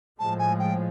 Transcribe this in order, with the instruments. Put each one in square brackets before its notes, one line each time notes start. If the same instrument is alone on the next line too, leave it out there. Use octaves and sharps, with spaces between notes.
[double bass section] A2 F3 G#3 [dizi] A5
[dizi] G#5
G5